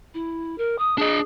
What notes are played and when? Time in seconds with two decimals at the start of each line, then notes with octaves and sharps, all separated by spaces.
0.14 E4
0.58 A#4
0.78 D#6
0.98 D4 G#4 D#5